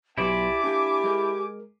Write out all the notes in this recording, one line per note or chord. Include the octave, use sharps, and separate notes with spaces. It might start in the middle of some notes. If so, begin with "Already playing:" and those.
B1 B3 E4 G4 D5 G#5 C6 D6
A#3 D4 G4
G#3 G#4 A#4